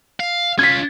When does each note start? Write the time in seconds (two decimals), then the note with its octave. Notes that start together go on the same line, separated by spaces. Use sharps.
0.20 F5
0.59 C#4 F4 G#6 B6